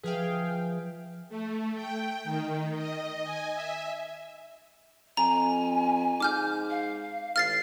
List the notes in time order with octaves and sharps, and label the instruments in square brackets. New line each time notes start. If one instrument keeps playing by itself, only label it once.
[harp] F3 [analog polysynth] G#4 F5 G5 [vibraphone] B4 E5
[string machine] A3
G5
D#3
D#5
G#5
E5
[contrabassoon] F2 [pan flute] G#5 [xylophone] A#5
[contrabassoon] G#2 [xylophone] D6 F6 G6
[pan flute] F5
[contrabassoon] A1 [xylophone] F6 A6 C7